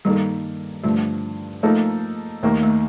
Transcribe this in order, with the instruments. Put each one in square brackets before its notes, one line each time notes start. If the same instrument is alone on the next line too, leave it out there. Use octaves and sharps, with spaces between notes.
[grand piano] G2 D#3 A#3 D#4 A4 [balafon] G3
[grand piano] G2 D3 F3 [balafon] A3
[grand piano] F3 A#3 D#4 A4 [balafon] A3
[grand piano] D#2 D#3 A#3 [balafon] A3
[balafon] A3